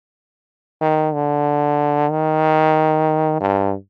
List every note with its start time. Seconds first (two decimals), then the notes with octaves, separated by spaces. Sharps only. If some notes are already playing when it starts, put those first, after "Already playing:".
0.81 D#3
1.14 D3
2.11 D#3
3.41 G2